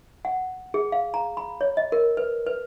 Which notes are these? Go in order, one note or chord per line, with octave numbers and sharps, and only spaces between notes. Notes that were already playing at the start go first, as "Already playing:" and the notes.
F#5
G#4
F5
A#5
B5
C#5
D#5
A#4
B4
B4